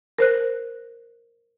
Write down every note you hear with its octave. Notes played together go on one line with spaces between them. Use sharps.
A#4 C5 F#6